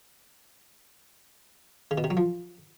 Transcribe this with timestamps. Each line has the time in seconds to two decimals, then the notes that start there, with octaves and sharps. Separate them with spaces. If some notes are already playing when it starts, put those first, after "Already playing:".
1.91 C#3
1.98 B2
2.04 C3
2.10 F#3
2.17 F3